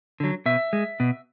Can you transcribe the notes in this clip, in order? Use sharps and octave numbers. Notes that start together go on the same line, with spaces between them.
D3 F#3
B2 E5
G#3
B2